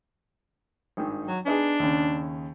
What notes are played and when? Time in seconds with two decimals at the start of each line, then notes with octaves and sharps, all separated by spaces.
0.97 G#1 G2 D#3
1.28 F#3
1.46 B3 D4 D#4 G#4
1.80 D#2 C#3